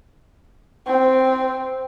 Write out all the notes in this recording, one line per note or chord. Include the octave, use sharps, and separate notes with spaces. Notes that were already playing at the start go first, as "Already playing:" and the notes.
C4